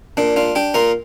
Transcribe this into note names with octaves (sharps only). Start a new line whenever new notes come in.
A#2 D4
D4 F4
D4 G4
A#2 F4 A#4